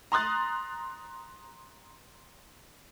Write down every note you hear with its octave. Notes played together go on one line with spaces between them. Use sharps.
A#5 C6 D#6 F#6 A6